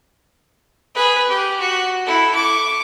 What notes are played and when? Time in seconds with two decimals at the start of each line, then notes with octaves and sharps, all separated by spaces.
0.95 G#4 B4
1.29 G4
1.60 F#4
2.05 E4 A4
2.34 C#6 D6